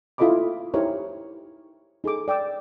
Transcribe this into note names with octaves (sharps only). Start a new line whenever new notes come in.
E4 F4 A4 D#5 B5 D6
D#4 E4 G4 A#4 C5 C#5
D#4 G#4 A4 D6
D5 G5 D6 E6